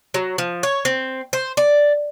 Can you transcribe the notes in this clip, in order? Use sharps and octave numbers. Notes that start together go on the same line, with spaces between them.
F#3
F3
C#5
C4
C5
D5